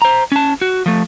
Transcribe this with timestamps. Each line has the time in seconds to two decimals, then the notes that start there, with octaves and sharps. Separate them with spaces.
0.02 C5 A#5
0.32 C#4 A5
0.61 F#4
0.86 F3 A3